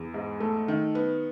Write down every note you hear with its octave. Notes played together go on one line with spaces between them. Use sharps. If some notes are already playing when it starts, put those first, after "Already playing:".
Already playing: E2
G#2
A3
D#3
B3